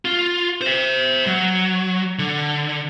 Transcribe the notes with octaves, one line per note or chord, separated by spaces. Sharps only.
F4
C5 E5
F#3
D3